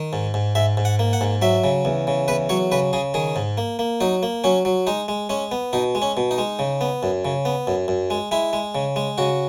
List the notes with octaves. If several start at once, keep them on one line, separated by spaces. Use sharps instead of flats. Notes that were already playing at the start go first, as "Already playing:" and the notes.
Already playing: D#3
G#2
G#2
G#2 E5
G#2
F#5
A#3
F#5
G#2
F#3 E5
C#3
E2
C#3
E2 B4
F#3 C#5
C#3 B4
C#3 G#4
D#3 G#4
G#2
A#3
A#3
F#3 D#4
A#3
F#3 C#4
F#3
G#3 D#4
G#3
G#3 C#4
B3
B2 D#4
G#3
C#4
B2
D#4
G#3
C#3
B3
F#2
C#3
B3
F#2
F#2
G#3
G#3 E4
G#3
C#3
G#3
C#3 F#4